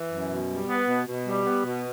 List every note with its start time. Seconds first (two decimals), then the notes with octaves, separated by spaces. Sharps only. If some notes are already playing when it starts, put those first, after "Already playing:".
Already playing: E3
0.09 F#2
0.28 B2
0.47 G3
0.67 B3
0.86 B2
1.07 B2
1.26 G3
1.45 B3
1.66 B2